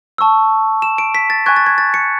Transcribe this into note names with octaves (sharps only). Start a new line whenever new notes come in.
A5 C#6 E6
E7
D7
B6
A6
G#5 C#6 F#6 G#6
A6
G#6
A6
C#7